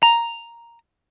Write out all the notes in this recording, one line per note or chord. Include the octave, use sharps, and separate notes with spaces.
A#5